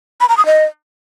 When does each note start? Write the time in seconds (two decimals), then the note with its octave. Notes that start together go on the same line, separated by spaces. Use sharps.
0.21 B5
0.29 A#5
0.37 D#6
0.46 D#5